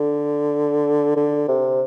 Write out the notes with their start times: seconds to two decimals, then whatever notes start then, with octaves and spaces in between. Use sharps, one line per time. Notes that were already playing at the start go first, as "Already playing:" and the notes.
Already playing: D3
1.16 D3
1.48 C3